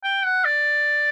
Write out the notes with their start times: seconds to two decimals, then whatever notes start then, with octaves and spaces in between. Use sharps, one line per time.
0.03 G5
0.25 F#5
0.45 D5